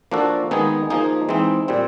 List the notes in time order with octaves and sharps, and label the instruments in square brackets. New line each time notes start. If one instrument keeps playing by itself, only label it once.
[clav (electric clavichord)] F3 A#3 D4 F#4 A4
D#3 G#3 B3 D#4 G#4
F3 A#3 D#4 G#4
E3 G#3 C4 D#4
A#2 G3 C4